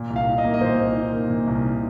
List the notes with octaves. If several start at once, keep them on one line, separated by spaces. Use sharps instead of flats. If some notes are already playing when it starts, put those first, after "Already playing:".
Already playing: A#2
C2
F5
D#4
D#5
A#3
D#5
A#2 C5
C2
D#4
A#3
A#2
C2
D#4